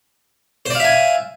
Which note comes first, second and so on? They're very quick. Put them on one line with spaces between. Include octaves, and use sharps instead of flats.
C5 D5 F5 E5 G#5